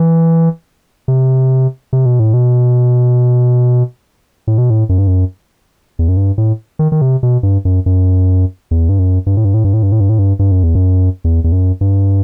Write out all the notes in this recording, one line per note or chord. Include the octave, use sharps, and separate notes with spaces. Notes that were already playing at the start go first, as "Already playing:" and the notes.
Already playing: E3
C3
C3
B2
A2
B2
A2
B2
A2
F#2
G2
F#2
E2
F#2
G2
A2
D#3
D#3
C3
B2
G2
F#2
F#2
E2
G2
F#2
G2
A2
G2
A2
G2
A2
G2
A2
G2
A2
G2
G2
F#2
E2
F#2
E2
E2
F#2
G2